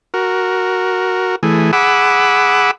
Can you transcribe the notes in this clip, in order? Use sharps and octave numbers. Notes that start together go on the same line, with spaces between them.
F#4 A#4
E3 A3 G#4
G#4 F#5 B5 D6 E6